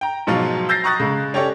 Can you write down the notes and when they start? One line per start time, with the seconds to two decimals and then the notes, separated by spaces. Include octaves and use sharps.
0.01 G5 A#5
0.27 G#2 B2 F3 F#3 F4
0.69 E6 G6 A6 A#6 C7
0.84 A#5 C#6 D#6 F#6 A6 A#6
1.00 C#3 G#3
1.34 C#4 G4 A4 C#5 D5